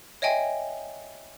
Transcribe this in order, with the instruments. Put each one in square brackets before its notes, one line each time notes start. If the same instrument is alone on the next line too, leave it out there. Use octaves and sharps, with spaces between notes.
[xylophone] C#5 D#5 E5 G5 G#5